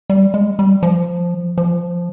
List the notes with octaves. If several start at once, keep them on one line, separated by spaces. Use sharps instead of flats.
G3
G#3
G3
F3
F3